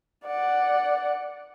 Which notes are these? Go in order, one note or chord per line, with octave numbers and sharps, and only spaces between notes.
D5 F#5